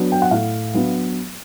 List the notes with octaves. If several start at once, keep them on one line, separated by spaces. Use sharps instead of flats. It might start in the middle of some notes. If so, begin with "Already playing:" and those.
Already playing: F#3 B3 D4
G5
F#5
A2 F5
F#3 B3 D4